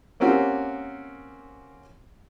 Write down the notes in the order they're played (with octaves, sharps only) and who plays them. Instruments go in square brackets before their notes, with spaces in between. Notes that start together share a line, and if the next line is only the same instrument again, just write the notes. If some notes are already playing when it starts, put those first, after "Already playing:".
[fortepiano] A#3 C4 C#4 F#4 G4